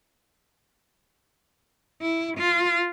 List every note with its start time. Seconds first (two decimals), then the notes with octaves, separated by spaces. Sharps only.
2.01 E4
2.38 F4